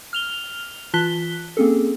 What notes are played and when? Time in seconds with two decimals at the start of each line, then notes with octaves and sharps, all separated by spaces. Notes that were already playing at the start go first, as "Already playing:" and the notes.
0.13 F6 F7 G7
0.94 E3 F4 A5 F#6 B6 G7
1.57 A#3 C4 C#4 G#4 A4